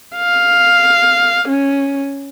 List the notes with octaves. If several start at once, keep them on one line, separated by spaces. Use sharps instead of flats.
F5
C#4